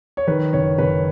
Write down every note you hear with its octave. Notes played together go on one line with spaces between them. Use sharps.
C#5
D#3 B4
F#1 C#5
F#1 B4